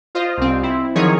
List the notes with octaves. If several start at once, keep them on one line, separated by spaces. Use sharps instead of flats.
F4 C5 D#5
C2 C4
C4 E4
D#3 F3 F#3 D#4 G#4 C#5